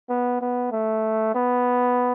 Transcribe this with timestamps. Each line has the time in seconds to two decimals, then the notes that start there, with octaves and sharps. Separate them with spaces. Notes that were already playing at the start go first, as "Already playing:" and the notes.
0.09 B3
0.41 B3
0.72 A3
1.34 B3